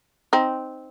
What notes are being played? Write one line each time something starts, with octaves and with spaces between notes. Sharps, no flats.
C4 D#4